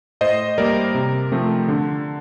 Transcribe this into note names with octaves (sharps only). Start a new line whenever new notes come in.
A2 C5 D#5
G3 A#3 A#4 D5
C3
F3 A3 C4
D3